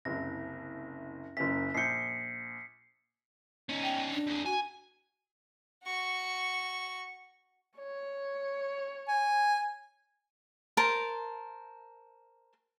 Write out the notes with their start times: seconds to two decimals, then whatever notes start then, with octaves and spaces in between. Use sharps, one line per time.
0.05 F#1 C2 A#6
1.37 F#1 F#2 B6
1.74 A#1 G6 C7 C#7
3.69 C#4 D#4
3.83 G5
4.12 D4
4.27 F2 G#4
4.46 F#4 G#5
5.84 F#4 C#6
7.78 C#5
9.08 G#5
10.77 A#4 C5 A5